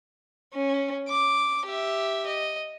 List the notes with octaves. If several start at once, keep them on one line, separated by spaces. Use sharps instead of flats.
C#4
D6
G4 E5
D#5